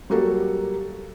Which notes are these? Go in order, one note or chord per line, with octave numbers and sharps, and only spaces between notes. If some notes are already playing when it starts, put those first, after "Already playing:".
F#3 G3 A#3 F#4 G4 A4